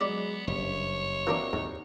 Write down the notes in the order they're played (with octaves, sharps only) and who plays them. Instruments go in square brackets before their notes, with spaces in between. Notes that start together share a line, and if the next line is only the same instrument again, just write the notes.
[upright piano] F#3 G#3 [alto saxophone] B3 [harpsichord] D5
[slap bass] F#1 [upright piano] G2 [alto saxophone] C#5
[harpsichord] E3 A#3 D4 [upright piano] C4 F#4 E5
[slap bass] D#2 [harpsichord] G#2